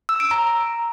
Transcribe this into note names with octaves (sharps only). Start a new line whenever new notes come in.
E6
D7
A#5